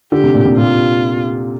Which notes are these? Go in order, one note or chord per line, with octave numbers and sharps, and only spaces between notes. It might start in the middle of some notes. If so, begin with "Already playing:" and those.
D3 G4
C3
A#2
C3
A#2 F4